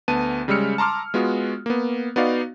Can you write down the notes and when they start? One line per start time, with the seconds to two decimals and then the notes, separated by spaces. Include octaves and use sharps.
0.08 D2 B3 A5 D#7
0.48 C#3 G3 G#3 E6 F6 C#7
0.78 A5 A#5 C6 D6 F6
1.14 G#3 B3 F4 F#4
1.66 A#3 B3
2.16 B3 D#4 F#4 D5 F5